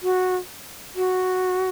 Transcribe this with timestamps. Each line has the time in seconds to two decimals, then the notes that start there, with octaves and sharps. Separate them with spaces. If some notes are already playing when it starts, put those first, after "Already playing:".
0.03 F#4
0.96 F#4